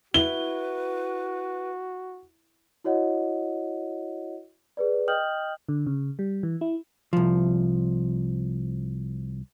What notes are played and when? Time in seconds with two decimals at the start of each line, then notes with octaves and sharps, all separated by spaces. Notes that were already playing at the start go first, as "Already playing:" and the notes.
0.14 E4 F#4 B4 G7
2.84 E4 F#4 C#5 D#5 F#5
4.77 G#4 B4 D5
5.08 D#5 G5 D#6 F6 G6 F#7
5.69 D3
5.87 C#3
6.19 G3
6.43 E3
6.61 E4
7.13 C2 F3